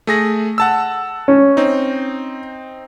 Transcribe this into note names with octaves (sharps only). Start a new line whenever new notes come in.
A3 G#4 A#6
F#5 A5 E6
C#4
C4 D#4